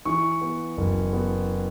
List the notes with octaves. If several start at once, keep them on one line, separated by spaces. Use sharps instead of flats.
E3 C#6
B3
F#1
B3